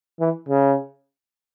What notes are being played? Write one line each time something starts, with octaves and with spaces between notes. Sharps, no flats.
E3
C#3